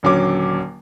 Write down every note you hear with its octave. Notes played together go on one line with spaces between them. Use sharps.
D#1 D3 F#3 C#4 D6